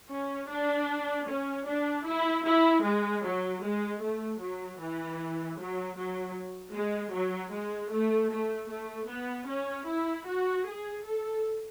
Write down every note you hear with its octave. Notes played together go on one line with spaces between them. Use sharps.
C#4
D4
C#4
D4
E4
E4
G#3
F#3
G#3
A3
F#3
E3
F#3
F#3
G#3
F#3
G#3
A3
A3
A3
B3
C#4
E4
F#4
G#4
A4